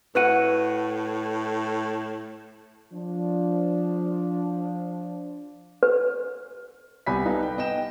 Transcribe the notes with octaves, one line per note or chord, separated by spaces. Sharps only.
A2 E4 F#4 B4 F#5 F#6 D#7
F3 D4
B4
C2 B3 G#5 B5 B6
G3 D#4 A4 B4 F5
G5
B3 D#5 G5 E7